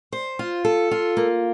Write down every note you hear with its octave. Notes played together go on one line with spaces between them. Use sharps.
C5
F4
A4
F4
A#3